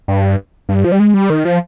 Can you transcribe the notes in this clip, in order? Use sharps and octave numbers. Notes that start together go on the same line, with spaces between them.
G2
G2
F3
G3
G#3
G3
D#3
F3